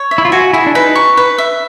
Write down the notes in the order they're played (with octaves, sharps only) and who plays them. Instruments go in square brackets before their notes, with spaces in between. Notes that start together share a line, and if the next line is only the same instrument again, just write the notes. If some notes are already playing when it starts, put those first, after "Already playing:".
Already playing: [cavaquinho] C#5
E5
[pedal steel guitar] E4
F4
[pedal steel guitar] F#4 [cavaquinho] G#5
[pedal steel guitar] E4 [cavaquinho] G#4
[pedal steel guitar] D4
[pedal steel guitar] D#4 [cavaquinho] B4
[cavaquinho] C#6
B4
E5